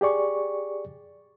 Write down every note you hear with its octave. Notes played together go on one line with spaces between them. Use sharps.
G4 G#4 D5 C#6